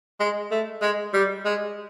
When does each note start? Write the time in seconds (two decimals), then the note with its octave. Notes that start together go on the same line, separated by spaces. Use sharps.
0.20 G#3
0.51 A3
0.82 G#3
1.14 G3
1.45 G#3